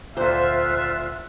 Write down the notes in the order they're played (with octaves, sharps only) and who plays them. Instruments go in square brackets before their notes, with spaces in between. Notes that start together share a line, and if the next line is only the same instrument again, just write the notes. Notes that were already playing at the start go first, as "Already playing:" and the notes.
[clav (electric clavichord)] D2 A#2 [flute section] F4 F#6 [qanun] C5 [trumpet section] E5